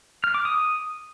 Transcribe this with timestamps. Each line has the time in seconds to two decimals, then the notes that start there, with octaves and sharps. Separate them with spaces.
0.24 F6
0.34 D6
0.45 D#6